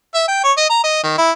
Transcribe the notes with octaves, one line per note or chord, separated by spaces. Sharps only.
E5
G5
C#5
D#5
A#5
D#5
D#3
E4